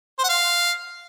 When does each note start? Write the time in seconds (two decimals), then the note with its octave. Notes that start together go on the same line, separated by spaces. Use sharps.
0.19 C5
0.24 F#5
0.29 F5